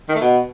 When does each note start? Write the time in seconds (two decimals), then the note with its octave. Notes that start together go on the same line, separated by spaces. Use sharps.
0.09 D#3
0.15 A3
0.21 B2